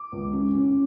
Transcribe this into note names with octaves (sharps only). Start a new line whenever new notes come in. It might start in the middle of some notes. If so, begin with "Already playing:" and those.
Already playing: D6
C#2
C#4
C#4